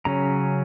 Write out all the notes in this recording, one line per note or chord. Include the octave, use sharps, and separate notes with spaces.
C#3 F#3 C#4 A#5